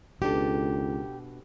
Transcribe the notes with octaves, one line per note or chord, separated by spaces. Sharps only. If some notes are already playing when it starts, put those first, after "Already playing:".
C#2 B2 D4 G4 A4